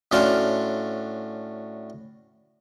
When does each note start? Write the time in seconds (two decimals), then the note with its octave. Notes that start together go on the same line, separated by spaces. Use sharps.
0.12 A2 C#4 D4 F#4 F5 C6